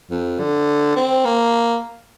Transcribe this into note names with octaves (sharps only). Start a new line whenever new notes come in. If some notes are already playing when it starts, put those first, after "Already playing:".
F2
D3
C4
A#3